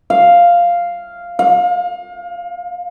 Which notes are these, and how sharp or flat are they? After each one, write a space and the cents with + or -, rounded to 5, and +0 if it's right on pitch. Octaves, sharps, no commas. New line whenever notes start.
F5 -5
F5 +30